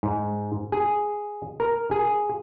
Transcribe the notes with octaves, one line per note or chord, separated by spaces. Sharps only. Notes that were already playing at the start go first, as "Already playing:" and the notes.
G#2
G#4
A#4
G#4